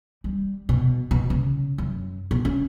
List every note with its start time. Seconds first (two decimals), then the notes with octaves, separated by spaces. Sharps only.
0.24 G3
0.69 B2
1.11 B2
1.30 C#3
1.78 F#2
2.31 B2
2.45 C#4